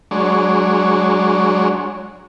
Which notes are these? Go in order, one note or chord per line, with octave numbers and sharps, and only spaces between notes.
F#3 G#3 D4 C#5